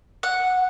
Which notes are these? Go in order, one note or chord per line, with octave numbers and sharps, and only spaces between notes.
F#5